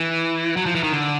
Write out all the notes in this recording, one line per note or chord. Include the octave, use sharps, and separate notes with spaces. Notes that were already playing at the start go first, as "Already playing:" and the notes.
Already playing: E3
F#3
F3
E3
D#3
D3